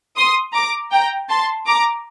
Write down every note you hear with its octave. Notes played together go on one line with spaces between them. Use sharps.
C6 D#6
A#5 D6
G5 A#5
A5 C6
A#5 D6